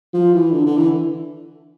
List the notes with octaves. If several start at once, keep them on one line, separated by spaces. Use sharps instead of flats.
F3
E3
D3
D3
E3